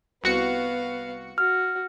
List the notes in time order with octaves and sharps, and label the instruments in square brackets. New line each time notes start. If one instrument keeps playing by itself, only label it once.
[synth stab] C2 F#4 C#7 [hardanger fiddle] B3 F5
[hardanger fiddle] F#4 [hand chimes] F6